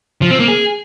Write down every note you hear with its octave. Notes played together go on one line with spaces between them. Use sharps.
F3
C4
A#3
G#4